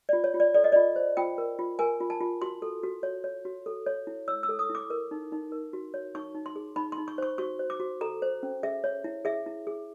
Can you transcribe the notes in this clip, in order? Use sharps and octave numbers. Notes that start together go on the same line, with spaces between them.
F4 D5
C#5
F4
D5
A4 D5
D#5
F4 D5
C5
F4 G5
A#4
F4
A#4 G#5
F4
A5
F4
F#4 C6
A4
F#4
C#5
C#5
F#4
A4
C#5
E4
C#5 E6
E6
A4
D#6
E4
D6
A#4
D#4
D#4
A#4
F#4
C#5
D#4 C#6
D#4
C6
G#4
D#4 B5
C6
D#4
C#6
C5 C#6
F#4 C#6
C5
D6
F#4
A4 A#5
C5
C#4
G#4 E5
C#5
E4
G#4 E5
E4
G#4